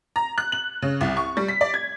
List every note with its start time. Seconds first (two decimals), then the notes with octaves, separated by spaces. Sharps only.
0.16 A#5
0.38 F#6
0.52 F#7
0.82 C#3
1.01 C2
1.17 C#6
1.37 G3
1.48 B6
1.61 D5
1.74 G#6